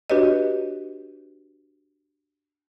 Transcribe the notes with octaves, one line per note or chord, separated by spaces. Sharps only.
D4 F#4 G4 B4 C#5 D#5